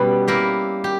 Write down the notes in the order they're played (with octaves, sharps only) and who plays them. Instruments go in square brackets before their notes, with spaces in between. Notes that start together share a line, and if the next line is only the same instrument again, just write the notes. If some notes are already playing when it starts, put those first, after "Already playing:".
Already playing: [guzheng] B2 G3 B3 C#4
A#3 E4 G4 A#4
G4